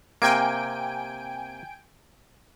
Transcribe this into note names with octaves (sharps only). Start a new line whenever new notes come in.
C3 A#3 G5 G#5 D7